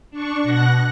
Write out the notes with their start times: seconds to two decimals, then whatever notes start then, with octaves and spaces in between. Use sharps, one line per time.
0.10 D4 C#6
0.43 B2 F#5 F#6 A#6